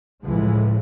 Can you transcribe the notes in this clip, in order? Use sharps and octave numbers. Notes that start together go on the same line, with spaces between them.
C#2 A2 E3 F3 G#3